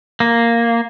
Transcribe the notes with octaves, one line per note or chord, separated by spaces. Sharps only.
A#3